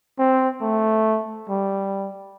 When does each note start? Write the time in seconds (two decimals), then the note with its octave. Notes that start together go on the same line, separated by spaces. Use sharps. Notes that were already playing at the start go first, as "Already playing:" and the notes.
0.19 C4
0.61 A3
1.50 G3